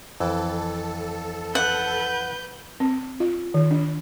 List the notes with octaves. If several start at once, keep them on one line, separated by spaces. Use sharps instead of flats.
F2 E3 A4
B4 F#5 G6
C4
F4
D#3
D4